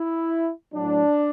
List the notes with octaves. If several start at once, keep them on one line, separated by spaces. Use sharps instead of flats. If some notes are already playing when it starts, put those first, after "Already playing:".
Already playing: E4
A2 F#3 D4